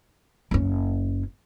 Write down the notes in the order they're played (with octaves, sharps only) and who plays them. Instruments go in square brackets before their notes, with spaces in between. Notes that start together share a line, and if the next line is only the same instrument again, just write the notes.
[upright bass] F#1 C#4